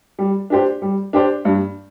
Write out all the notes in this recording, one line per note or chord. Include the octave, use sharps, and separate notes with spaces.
G3
D4 G4 C5
G3
D4 G4 C5
G2